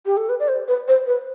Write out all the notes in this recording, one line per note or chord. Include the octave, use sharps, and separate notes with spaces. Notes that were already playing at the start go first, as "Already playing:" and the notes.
G4
A4
B4
D5
C5
B4
C5
B4